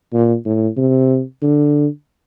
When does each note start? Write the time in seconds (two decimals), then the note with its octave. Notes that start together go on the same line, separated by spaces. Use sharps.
0.13 A#2
0.46 A2
0.77 C3
1.42 D3